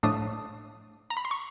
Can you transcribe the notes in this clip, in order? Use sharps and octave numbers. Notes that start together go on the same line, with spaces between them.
A2 F3 A3 D4 D#6
A#5
B5
C6
C#6